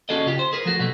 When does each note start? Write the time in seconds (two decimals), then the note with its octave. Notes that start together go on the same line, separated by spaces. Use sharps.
0.09 C#4 F#4 G#4 A4 D5 D#5
0.26 C#3 F4 G4
0.39 C5
0.53 G#4 A#4 B4
0.65 F3 F#3 A3 F#4
0.80 B2 G3 A3